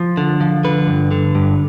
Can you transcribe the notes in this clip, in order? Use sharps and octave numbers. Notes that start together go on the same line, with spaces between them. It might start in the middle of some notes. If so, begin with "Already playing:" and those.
Already playing: F3
D3
F3
D3 B4
G2
D3
G2